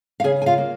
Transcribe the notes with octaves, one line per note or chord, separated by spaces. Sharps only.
F5
C#3 G#4 G#5
G#5
F4 F5
A#3